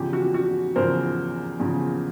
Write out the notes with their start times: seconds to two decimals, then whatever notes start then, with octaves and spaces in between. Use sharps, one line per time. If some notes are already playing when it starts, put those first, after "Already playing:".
Already playing: E2 C#3 F3 G4
0.13 F#4
0.34 F#4
0.76 E2 C#3 F3 A#4 C5
1.60 E2 C#3 F3